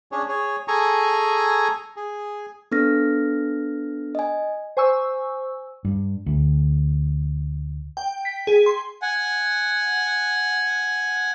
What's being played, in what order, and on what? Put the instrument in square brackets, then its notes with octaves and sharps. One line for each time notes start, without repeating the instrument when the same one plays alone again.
[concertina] C#4 D4 G#4 C#5
G#4 C#5
G#4 A4 G#5 A#5 C#6
G#4
[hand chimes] B3 D4 A4 F6 A#6
D#5 G#5
[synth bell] C5 G#5 C#6 E6
[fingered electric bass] G2
D2
[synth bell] G5
B6
G#4
C6
[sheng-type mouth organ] F#5 G#5